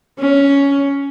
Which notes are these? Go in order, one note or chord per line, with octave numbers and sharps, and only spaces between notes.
C#4